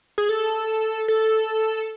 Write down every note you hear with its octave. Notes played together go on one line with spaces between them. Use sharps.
G#4
A4
A4